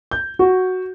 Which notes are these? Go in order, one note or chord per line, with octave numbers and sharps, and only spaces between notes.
G6
F#4